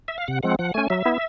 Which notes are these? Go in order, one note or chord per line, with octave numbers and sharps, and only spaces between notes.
E5
F5
C3 F#5
F3 G#3 C4 F#5
F3 F#5
A3 C#4 G#5
F#3 E5
B3 E4